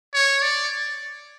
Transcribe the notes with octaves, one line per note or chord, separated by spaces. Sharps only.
C#5
D5